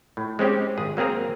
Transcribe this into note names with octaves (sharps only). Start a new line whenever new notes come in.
A2
G#3 C4 C#4 G4
G#1 G#4
F#3 A#3 C4 G#4 A#4